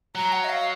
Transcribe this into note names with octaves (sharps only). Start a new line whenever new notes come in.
F#3 A#5
F#5
D#5
F5